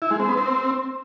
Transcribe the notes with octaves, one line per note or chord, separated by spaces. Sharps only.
E4
G#3
C4
B3
C4